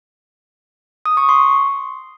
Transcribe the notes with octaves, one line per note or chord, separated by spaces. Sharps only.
D#6
C#6
C6